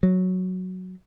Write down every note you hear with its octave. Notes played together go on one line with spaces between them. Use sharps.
F#3